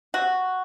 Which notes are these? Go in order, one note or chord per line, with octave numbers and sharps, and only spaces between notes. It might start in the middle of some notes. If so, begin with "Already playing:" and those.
C3 F#4